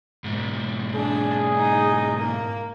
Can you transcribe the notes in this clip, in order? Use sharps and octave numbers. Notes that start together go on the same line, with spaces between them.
G#2 B2
D4 G#4
D#4
A#3